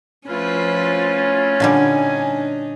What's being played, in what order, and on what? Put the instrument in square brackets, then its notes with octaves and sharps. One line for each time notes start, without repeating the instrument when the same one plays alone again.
[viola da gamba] F3 B4 C5 [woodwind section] A3 E4 F4 [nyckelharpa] C#4
[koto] A#2 D3 G3 [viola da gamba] D4 D#4 [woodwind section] G#5